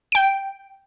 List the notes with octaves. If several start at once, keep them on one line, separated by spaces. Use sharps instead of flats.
G5 D7